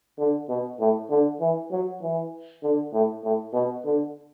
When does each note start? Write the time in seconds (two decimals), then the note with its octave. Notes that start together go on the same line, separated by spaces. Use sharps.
0.18 D3
0.49 B2
0.80 A2
1.10 D3
1.41 E3
1.71 F#3
2.02 E3
2.63 D3
2.93 A2
3.24 A2
3.53 B2
3.85 D3